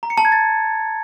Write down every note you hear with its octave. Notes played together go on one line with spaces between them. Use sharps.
A#5
C#7
A5
G#6
A6